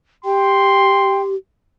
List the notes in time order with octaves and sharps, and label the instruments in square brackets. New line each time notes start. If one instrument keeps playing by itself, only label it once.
[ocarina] G4 [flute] G5 [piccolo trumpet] C6